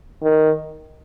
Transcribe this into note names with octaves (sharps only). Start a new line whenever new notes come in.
D#3